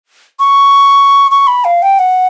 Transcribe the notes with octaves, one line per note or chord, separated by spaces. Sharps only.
C#6
C#6
B5
F5
G5
F#5